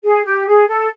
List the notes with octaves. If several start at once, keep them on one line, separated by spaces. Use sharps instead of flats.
G#4
G4
G#4
A4